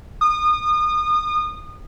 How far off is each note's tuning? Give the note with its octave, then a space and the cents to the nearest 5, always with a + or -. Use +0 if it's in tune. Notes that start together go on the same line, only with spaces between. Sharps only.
D#6 -30